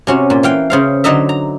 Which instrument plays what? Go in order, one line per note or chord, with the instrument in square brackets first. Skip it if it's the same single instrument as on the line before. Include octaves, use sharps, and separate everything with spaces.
[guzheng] C3 C#4 F#4
A#2
E3 F5 G5
C#3 C5 F5
D3 F#3 D#4 D#5 E5
A#5